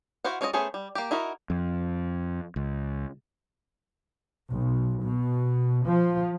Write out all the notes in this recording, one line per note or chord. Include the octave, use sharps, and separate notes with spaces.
E4 F#4 C5 F5 F#5
G#3 C#4 F4 C5 D#5
A3 B3 C#4 G#4 C5
G3
A#3 G4
D#4 E4 F#4 A#4
F2
C#2
B1
B2
F3